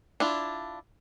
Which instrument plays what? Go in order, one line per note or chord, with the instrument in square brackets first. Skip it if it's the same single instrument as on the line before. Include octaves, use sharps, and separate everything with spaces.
[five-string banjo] D4 E4 F4